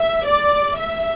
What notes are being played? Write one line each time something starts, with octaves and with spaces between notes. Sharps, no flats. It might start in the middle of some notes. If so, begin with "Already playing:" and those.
Already playing: E5
D5
E5